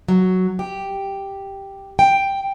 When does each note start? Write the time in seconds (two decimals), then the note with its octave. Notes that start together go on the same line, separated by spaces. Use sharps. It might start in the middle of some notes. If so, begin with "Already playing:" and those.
0.08 F#3
0.59 G4
1.99 G5